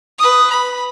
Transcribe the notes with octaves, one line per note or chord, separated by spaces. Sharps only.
B4 D#6
B5